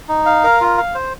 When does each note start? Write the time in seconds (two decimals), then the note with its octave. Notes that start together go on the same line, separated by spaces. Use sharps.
0.09 D#4
0.26 F5
0.44 A#4
0.61 F4
0.78 F5
0.95 C5